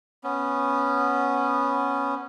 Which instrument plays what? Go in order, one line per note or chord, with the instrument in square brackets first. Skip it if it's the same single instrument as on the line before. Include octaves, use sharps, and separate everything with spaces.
[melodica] B3 C#4